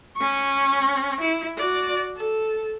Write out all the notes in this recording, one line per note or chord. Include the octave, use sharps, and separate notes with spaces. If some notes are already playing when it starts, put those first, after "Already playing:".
C#4 C#6
E4
F#4 D5
A4